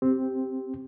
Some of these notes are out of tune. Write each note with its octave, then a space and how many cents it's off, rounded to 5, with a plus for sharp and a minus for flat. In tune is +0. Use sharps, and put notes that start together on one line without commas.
C4 +0 G4 +0